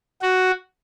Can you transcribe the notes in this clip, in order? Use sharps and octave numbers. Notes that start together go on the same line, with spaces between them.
F#4